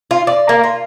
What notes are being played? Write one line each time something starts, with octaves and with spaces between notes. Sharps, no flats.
F4
D5
A#3
F4